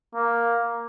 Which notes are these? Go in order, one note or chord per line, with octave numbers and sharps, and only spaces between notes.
A#3